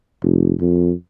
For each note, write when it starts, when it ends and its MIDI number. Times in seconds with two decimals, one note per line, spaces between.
0.22 0.54 29
0.61 0.92 41